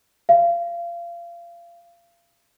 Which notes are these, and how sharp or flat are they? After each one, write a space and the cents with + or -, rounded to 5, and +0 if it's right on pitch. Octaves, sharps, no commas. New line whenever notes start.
F5 -30